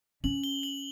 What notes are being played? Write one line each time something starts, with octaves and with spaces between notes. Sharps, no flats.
C#4 F#7
G7
F#7